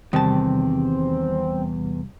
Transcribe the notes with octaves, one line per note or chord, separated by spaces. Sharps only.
E2 C3 D#3 G3 C4 A5